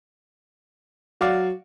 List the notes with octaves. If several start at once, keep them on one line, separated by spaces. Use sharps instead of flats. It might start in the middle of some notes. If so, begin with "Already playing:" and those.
F#3 F#4 D5 F5